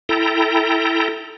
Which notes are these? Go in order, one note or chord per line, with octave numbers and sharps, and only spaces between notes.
E4 A4 G5 A#5